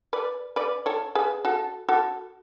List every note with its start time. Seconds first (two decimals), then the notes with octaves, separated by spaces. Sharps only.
0.13 B4 D5
0.56 B4 D5
0.86 A4 C#5
1.15 G#4 B4
1.45 F#4 A4
1.88 F#4 A4